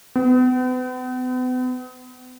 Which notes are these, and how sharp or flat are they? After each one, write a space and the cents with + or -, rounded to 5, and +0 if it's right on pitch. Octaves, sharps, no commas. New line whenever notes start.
B3 +40